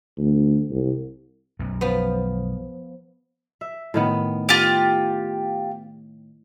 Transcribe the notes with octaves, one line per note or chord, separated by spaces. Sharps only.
D2
C2
B1 F#2
F3 B3
E5
A2 D#3 B3
F4 G4